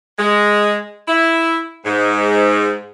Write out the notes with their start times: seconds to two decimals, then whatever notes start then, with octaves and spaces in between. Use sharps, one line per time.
0.19 G#3
1.08 E4
1.85 G#2